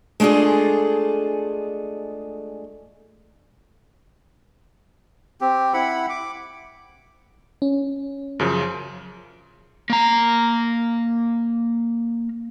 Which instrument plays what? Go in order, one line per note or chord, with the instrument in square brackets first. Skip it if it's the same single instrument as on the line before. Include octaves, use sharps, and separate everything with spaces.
[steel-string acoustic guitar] G#3 A3 D4 F4 G#4
[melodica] C4 G4
E4 F#5 B5
D6
[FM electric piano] C#4
[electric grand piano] F#2 C#3 F3
[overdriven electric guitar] A#3 A#5